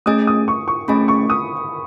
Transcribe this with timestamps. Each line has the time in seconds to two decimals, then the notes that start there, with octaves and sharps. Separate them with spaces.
0.06 A3 C#4 G#4 D#5 G#5 D#6
0.27 D#6
0.48 C#6
0.68 C#6
0.88 A3 C#4 G#4 D#5 G#5 B5
1.08 C#6
1.30 D#6